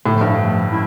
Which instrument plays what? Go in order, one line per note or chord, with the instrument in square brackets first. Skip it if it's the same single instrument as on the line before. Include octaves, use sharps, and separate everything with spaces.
[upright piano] A2 [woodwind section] D3 F3 A3
[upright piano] G2
[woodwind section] D3 F3 A3
F3 G#3 C#4 E4